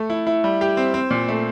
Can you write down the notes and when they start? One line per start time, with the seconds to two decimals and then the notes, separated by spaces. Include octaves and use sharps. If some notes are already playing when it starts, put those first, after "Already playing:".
Already playing: A3
0.10 E4
0.27 E4
0.44 G3
0.61 G4
0.77 C4
0.94 C4
1.10 A#2
1.28 A3